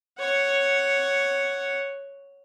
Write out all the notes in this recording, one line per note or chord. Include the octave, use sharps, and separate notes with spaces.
C#5 F#5